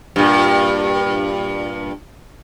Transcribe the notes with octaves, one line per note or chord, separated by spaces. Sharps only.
G2 A#2